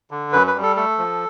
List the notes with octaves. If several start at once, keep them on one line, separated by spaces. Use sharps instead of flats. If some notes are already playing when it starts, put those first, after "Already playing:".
D3
F#2 B4
B4
G3
A4
A3 A4
F3